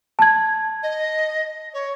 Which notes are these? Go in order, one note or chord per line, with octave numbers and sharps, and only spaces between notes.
A5 G#6
D#5
C#5